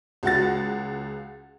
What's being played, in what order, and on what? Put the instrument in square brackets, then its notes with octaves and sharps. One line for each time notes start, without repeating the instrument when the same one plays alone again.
[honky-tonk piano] C#2 F#4 F#5 A6